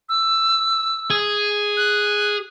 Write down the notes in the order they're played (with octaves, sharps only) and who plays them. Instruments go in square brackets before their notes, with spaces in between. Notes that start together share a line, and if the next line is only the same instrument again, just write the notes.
[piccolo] E6
[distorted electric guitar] G#4
[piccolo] F#6